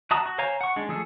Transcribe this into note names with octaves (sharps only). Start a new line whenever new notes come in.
F#4 E5 A5 A#5 D#6
F#4
C5 C#5 F5 G#5 A#5
F#5 C#6
G#3 D4
F3 A3 G#4 A4